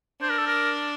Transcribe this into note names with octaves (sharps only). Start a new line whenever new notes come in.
D4 C5
A#4
A4
A#4